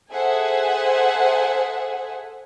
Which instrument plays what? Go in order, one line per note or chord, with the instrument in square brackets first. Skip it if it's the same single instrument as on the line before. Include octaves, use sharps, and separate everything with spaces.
[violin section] G#4 A4 C5 E5 F#5 G#5